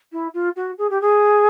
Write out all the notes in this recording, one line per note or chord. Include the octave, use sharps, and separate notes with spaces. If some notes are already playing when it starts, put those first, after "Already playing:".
E4
F4
F#4
G#4
G4
G#4